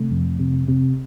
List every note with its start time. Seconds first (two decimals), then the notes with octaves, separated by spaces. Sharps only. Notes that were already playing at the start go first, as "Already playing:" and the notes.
Already playing: C3 A3
0.11 F2
0.39 C3
0.68 C3